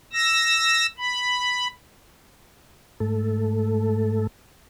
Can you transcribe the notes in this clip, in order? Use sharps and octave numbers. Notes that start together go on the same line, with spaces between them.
E6 A#6
B5
G#2 A3 A4